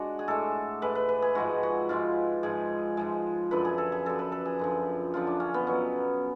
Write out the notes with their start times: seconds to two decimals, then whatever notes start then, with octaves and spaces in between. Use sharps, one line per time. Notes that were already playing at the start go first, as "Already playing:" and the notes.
Already playing: G#3 D4 F#4
0.19 G#4
0.28 A2 G#3 A4
0.82 A2 G#3 B4
0.95 B4
1.09 B4
1.22 G#4
1.35 G#2 F3 G#3 F#4
1.63 F#4
1.89 G#2 F3 G#3 F4
2.43 G#2 F3 G#3 G#4
2.97 G#2 F3 G#3
3.51 F#2 D3 F3 B4
3.65 G#4
3.78 A4
3.92 G#4
4.06 F#2 D3 F3 A4
4.19 B4
4.32 A4
4.45 G#4
4.59 F#2 D3 F3
5.14 F#2 D3 F3 F4
5.27 D4
5.40 C#4
5.54 B3
5.67 B2 F#3 C#4